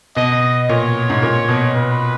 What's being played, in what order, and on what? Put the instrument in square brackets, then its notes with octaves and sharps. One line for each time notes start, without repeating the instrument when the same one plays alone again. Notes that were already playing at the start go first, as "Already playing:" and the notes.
[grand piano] B2 [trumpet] D#5
[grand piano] A#2 [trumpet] C#5
[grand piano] G#2
A#2
B2
[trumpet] B4